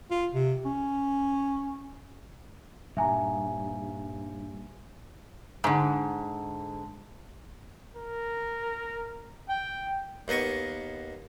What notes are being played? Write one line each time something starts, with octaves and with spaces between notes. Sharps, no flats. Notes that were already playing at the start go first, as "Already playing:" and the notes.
F4
C3
C#4
G2 A#2 G3 E5 G#5 A#5
G#2 D3
A#4
G5
D#2 A#3 B3 D#5 C#6